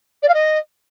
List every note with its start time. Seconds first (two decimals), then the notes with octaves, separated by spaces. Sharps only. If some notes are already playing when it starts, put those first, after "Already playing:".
0.22 D5
0.28 F5
0.34 D#5